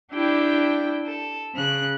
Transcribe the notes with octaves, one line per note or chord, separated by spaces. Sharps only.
D4 E4 G4 G5
A4
C#3 F#6